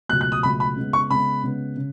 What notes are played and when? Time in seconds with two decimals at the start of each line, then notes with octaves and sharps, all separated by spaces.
0.09 C#2 B2 F#3 A3 F#6
0.21 F#6
0.32 D#6
0.43 C#2 B2 F#3 A3 B5
0.60 B5
0.76 C#3 G#3 B3
0.93 C#6
1.10 C#3 G#3 B3 B5
1.44 C#3 G#3 B3
1.77 C#3